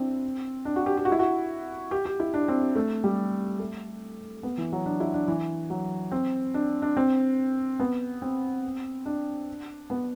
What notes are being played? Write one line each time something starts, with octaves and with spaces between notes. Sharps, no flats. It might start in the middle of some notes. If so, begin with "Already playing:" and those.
Already playing: C4 D4 E4
D4
F#4
G4
G4
F#4
E4
F#4
G4
G4
E4
D4
C4
A3
G3
A3
B3
E3
F#3
D4
E4
D4
E3
F#3
C4
D4
D4
C4
B3
C4
D4
B3